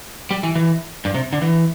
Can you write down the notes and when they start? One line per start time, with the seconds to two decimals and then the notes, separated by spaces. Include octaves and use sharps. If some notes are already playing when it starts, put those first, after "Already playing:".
0.31 G3
0.43 E3
0.55 E3
1.05 G2
1.14 C3
1.33 D3
1.42 E3